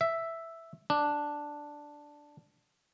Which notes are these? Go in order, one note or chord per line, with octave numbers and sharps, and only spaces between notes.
E5
D4